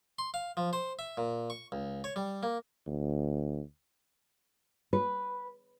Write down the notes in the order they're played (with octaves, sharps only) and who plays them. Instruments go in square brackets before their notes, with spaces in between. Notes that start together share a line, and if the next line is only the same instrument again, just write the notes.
[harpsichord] C6
F5
F3
C5
E5
A#2
C#6
C#2
C#5
G3
A#3
[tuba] D2
[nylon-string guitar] B4